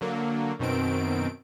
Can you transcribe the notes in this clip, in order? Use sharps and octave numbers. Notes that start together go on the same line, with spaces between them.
D3 F#3 A#3
F#2 B2 D#3 C4 D7